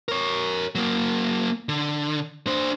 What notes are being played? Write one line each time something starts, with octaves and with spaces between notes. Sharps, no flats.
A#4 C#5
F#3 A#3
D3
D4 C5